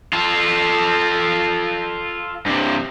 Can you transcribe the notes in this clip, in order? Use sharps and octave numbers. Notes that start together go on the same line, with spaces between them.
F4 A4
G2 C3